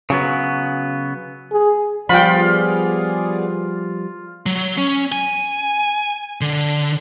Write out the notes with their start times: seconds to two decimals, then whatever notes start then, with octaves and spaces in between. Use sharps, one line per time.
0.10 C#3 F#3 B3
1.52 G#4
2.09 F3 G3 B3 F4 G#4 D5 G5 B5
4.46 F#3
4.78 C#4
5.12 G#5
6.41 D3